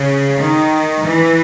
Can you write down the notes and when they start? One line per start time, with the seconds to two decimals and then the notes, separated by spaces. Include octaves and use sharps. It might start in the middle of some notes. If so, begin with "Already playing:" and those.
Already playing: C#3
0.39 D#3
1.05 E3